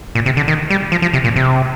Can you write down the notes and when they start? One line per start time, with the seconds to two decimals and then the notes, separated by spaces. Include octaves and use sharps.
0.15 A#2
0.26 C3
0.37 D3
0.48 D#3
0.70 G3
0.92 F3
1.02 F3
1.13 C3
1.24 A#2
1.36 C3